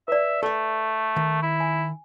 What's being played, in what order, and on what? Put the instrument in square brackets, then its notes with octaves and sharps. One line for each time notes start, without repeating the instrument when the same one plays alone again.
[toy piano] B4 D5 [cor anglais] E5
[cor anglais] A3 [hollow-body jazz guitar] A4 E5
[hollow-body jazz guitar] D#3
[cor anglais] E4
[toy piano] G#5